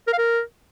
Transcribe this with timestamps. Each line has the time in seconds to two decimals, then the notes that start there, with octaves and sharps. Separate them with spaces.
0.07 A#4
0.13 F5
0.18 A#4